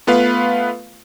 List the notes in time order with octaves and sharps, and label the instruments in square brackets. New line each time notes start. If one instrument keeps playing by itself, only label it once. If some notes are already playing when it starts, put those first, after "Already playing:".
[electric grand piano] A3 B3 F4 B4 F5